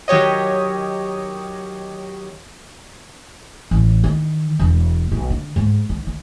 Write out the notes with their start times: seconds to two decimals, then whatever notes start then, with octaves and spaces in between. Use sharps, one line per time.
0.08 D#3 F#3 G4 C#5 D#5
3.71 A1
4.04 D#3
4.59 E1
5.12 B1
5.30 D3
5.56 G#2
5.89 D#3
6.06 D#3